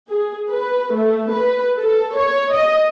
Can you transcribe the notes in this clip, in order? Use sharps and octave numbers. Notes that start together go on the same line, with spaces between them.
G#4
B4
A3
B4
A4
C#5
D#5